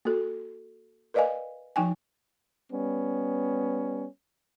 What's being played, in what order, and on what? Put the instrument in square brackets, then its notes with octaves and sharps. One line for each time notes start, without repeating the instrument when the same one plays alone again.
[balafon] A#3 F#4 A4
A#4 B4 D5 D#5 F5 G#5
F3 D#4 G5 G#5
[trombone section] G3 B3 C#4